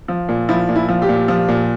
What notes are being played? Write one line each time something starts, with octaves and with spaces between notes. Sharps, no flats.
F3
A#2
F3 E4
A#2
E4
F3
G4
A#2
F3
A#2